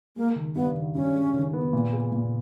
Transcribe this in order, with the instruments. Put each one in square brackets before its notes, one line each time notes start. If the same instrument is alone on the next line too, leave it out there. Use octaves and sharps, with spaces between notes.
[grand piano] G#3 [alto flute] A#3
[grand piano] D#3
[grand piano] G2 [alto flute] B3
[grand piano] D#3
[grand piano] G2 [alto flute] C#4
[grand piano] G#3
D#3
B3
A#2
G#4
A#2